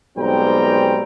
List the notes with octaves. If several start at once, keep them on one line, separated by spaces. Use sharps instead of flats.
B1 G#2 G3 C4 G5 A#5